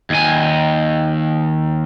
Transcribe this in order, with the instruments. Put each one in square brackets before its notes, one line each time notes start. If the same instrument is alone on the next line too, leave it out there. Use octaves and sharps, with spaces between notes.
[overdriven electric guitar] D#2 G#5